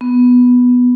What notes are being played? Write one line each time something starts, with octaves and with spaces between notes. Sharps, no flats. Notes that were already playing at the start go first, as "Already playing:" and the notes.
B3